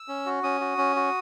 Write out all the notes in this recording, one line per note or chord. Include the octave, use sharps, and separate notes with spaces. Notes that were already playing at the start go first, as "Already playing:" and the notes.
Already playing: E6
C#4
F#4
C#4 D#6
F#4
C#4
F#4